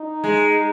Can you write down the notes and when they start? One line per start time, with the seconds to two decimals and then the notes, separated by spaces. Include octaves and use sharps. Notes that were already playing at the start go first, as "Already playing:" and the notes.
Already playing: D#4
0.24 G#3